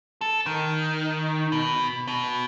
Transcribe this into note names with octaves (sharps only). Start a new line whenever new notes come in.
A4
D#3
B2
B2